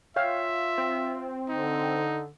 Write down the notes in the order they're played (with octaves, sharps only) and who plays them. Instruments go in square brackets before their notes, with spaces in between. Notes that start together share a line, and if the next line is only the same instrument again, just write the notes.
[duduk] F4 [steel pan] C#5 F5 G5 [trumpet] E5
[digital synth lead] C4
[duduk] D3 [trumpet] D#4